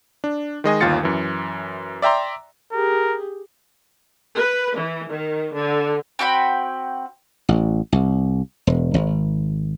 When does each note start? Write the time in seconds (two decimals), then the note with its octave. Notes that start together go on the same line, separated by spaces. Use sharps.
0.24 D4
0.64 D#3 G#3 D#5 G#5
0.81 G1 D#2 F4 F5 A6 C#7
1.03 F#2 E3
2.02 D5 E5 G5 A#5 C6
2.73 G4 G#4 A#4
4.37 B4
4.77 E3
5.09 D#3
5.53 D3
6.19 C4 F#4 G5 B5
7.49 A1
7.92 C2
8.67 E1
8.94 G#1